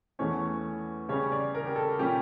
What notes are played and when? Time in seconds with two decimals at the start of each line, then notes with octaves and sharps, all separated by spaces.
0.19 E2 E3 A3 C#4 C#5
1.09 C#3 G3 C#4 C#5
1.32 D5
1.55 A#4
1.65 G4
1.76 A4
1.99 A#2 G3 C#4 G4